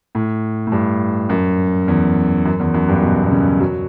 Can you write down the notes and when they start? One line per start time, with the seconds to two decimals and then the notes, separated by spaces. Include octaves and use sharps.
0.15 A2
0.67 A2
0.72 G2
1.29 F#2
1.88 E2
2.45 F#2
2.60 E2
2.74 F#2
2.88 G2
3.02 B2
3.24 B2
3.31 C#3
3.60 F#3